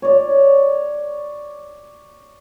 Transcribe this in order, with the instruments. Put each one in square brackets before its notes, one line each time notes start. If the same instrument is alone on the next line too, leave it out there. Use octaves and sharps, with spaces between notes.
[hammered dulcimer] C#5 D5